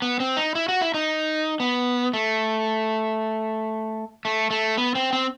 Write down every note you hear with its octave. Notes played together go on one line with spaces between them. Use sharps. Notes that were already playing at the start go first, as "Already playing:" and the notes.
B3
C4
D#4
E4
F#4
E4
D#4
B3
A3
A3
A3
B3
C4
C4